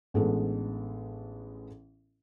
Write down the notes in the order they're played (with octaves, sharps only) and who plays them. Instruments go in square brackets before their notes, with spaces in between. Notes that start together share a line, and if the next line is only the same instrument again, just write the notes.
[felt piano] A1 G#3 B3 D4 A4